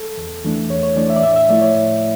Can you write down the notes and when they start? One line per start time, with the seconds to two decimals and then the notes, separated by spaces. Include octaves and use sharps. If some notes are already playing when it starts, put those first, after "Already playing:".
Already playing: A4
0.17 E2
0.44 E3 A3 D4
0.70 E2 C#5
0.83 C#5
0.96 E3 A3 D4 D5
1.10 E5
1.16 D5
1.22 A2 E5
1.36 E5
1.49 F3 A3 E4 D5
1.62 C#5
1.75 A2